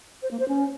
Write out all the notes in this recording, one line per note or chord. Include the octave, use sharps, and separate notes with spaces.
C5
A#3
C5
C#4